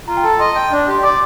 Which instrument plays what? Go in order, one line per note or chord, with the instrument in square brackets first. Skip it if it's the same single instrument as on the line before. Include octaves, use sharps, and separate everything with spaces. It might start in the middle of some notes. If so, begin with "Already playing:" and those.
[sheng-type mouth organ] F4 [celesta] A#5
[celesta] G5
[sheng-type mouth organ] A4 [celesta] A5
[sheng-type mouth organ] D#5 [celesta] C6
[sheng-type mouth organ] G5
D4
[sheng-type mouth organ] G4 [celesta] C6
[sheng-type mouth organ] D5 [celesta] D6